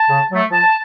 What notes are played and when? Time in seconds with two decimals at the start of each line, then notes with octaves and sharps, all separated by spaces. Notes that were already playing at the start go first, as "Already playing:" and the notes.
Already playing: A5
0.09 C#3
0.30 F#3 A3
0.51 F3 A5